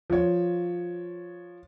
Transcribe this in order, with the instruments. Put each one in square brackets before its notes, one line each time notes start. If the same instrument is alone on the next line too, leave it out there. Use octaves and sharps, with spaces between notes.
[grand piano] F3 C#5